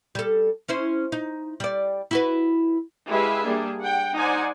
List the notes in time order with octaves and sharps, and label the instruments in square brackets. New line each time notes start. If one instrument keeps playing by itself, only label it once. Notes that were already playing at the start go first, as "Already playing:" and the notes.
[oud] G3 A4
C#4 E4 C5
D#4
G3 D5
E4 F#4 B4
[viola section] G#3 E4 G4 B4 E5 F5
G3 A#3 D4 G#4
F#5 G5
D#4 C5 D5 F#5 G#5